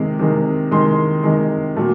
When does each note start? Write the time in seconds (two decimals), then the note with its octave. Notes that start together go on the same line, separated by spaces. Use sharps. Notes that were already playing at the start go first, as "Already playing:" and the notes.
Already playing: C3 D#3 G#3
0.19 C3 D#3 G#3
0.71 C3 D#3 G#3 C6
1.23 C3 D#3 G#3
1.76 A#2 F#3 A3